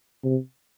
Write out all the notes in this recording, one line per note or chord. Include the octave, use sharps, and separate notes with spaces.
C3